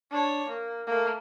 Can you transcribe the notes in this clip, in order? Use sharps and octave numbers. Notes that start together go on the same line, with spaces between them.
D4 C#5
A#3
A3 A#3